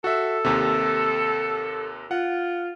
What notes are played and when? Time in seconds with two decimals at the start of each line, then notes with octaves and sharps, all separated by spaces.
0.04 F#4 A4 E5
0.45 D#2 C3
2.11 F4 F#5